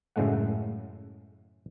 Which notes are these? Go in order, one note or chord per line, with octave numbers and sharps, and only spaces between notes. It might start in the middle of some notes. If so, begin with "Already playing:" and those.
F#2 A2 C#3 G#3 A3 F#5